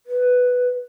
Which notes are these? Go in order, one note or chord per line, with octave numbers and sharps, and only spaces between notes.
B4